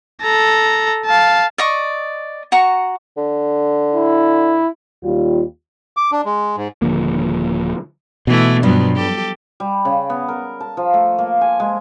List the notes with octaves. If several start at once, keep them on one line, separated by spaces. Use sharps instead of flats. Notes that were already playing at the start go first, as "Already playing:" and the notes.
A4 A#5
F5 A5
D5 D#5 C#6
F#4 A#5 C#6
D3
E4
D#2 G3 F4
D6
D4
G#3
G#2
D#1 D3 F3 A#3
B2 E3 A3 E4
G2 F3 F#3 B3
G4 A4
G3
C#3
B3
A#4
A5
F3
A3
A#3
G#5
G#3